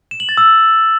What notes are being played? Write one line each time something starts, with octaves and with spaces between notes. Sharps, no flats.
E7
F#7
A6
E6